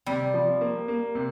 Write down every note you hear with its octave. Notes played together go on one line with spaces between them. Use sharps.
C3 G3
F3
A#3
A#3
C3